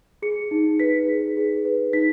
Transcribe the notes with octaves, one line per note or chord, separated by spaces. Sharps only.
G#4 C#7
D#4
B4 B6
G#4
G#4
B4
D#4 B6